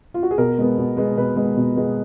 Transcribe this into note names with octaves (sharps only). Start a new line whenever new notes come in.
F4
F#4
G#4
B2 A#4
G#3 B3
B2
G#3 B3
B2 B4
G#3 B3
B2
G#3 B3